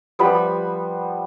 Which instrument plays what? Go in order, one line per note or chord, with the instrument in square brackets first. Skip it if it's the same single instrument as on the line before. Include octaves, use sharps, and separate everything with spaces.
[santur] F3 G3 B3 B5